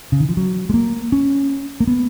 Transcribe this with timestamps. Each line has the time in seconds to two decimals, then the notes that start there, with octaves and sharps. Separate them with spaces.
0.12 C#3
0.20 D#3
0.29 F3
0.37 F#3
0.70 G#3
0.74 A#3
1.12 C#4
1.80 A#3
1.87 B3